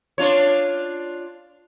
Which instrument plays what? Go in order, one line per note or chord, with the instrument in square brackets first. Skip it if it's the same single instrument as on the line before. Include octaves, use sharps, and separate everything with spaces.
[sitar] D4 F4 C#5